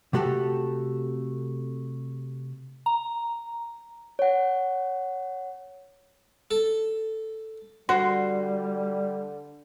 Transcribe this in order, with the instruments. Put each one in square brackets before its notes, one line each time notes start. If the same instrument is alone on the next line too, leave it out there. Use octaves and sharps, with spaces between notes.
[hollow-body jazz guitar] C3 A3 F#4 G4 A4
[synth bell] A#5
[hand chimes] C#5 F#5
[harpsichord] A4
[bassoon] D3 [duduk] G3 [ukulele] F#4 C5 [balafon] C6